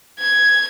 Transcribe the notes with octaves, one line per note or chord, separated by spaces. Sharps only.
G#6